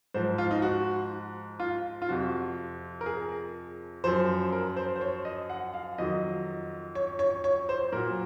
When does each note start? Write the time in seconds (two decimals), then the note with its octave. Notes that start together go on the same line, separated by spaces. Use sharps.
0.14 G#2 F3 C5
0.38 F4
0.51 D#4
0.62 F#4
1.60 F4
2.02 F4
2.09 F2 C3 F3 F#4
3.01 A#4
3.06 G#4
4.04 F#2 F3 C5
4.52 A#4
4.76 C5
4.96 C5
5.01 C#5
5.25 D#5
5.50 F#5
5.74 F5
5.98 F2 D#3 F#3 D#5
6.95 C#5
7.19 C#5
7.44 C#5
7.69 C5
7.93 A#2 F#3 A#4